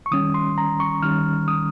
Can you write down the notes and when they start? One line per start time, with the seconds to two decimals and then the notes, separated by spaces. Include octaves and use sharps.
0.06 C#6
0.12 D#3 G3 C#4 D#6
0.34 C6
0.58 A#5
0.80 C#6
1.03 D#3 G3 C#4 F6
1.48 D#6